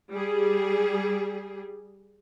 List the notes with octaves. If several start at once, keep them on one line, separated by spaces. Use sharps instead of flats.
G3 G#4